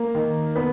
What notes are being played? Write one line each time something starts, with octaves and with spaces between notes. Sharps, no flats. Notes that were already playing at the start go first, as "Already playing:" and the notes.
Already playing: A#3 A#4
D#3
B3 B4